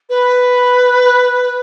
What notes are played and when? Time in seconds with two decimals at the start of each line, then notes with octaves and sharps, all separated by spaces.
0.09 B4